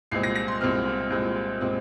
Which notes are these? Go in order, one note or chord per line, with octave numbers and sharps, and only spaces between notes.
C2 A#2 G#3 C4 C7
A#6
A#6
C6
C2 A#2 G#3 C4 F6
C2 A#2 G#3 C4
A#2 G#3 C4